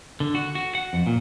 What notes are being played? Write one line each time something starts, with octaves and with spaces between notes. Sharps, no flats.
D3
F#4
F#4
F#5
F2
A#2